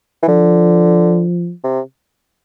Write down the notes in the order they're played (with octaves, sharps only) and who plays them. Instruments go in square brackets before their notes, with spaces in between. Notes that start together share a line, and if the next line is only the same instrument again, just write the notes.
[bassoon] E3
[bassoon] D3 [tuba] F3
[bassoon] C3